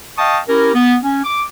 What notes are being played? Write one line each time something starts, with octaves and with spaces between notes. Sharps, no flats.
D#5 F5 G5 A5 C#6 D#6
C#4 E4 G4 A#4
B3
C#4
D6